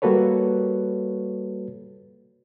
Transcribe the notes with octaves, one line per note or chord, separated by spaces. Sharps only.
G3 A#3 F#4 A4 B4 C#5